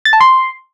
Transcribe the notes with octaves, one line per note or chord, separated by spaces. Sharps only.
A6
A5
C6